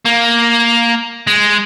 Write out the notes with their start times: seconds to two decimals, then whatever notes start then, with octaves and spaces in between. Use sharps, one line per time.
0.06 A#3
1.27 G#3